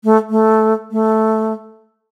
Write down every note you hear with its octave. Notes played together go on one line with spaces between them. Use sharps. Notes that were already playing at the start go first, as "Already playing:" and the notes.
A3
A3
A3